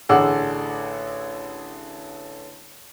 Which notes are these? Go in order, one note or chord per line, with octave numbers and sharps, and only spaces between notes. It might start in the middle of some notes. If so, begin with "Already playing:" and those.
A1 D3 G#4 F#5 D6 E6